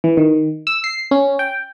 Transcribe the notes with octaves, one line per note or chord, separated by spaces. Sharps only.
E3
D#3
E6
C7
C#4
G5